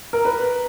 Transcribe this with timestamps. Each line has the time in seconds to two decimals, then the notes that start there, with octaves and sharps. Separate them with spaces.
0.13 A#4
0.25 B4